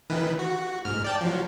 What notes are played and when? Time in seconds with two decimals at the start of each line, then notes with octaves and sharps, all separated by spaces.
0.10 D#3 E3 B4
0.39 F#4
0.85 G#2 F6
1.04 D5 G5 A5
1.21 F3 F#3